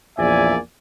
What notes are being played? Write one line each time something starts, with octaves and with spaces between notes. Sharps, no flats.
A#1 E2 A#2 D5 E5 G#5